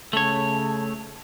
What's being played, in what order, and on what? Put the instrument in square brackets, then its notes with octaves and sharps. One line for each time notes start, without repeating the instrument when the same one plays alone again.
[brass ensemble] C#3 [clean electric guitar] A3 C#5 [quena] A5